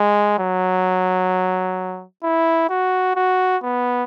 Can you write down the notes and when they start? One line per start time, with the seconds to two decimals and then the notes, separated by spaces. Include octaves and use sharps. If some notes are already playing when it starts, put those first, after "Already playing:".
Already playing: G#3
0.38 F#3
2.23 E4
2.70 F#4
3.16 F#4
3.63 B3